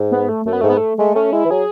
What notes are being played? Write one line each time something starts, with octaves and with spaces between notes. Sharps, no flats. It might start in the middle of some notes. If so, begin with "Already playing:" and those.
Already playing: G#2
B3
A3
F#2 A3
B3
G#2 A3
B3
A3
G#3 A3
A3 C#4
G#3 E4
E3
F#3 G#4